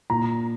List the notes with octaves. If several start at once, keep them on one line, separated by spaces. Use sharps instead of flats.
A#2 A#5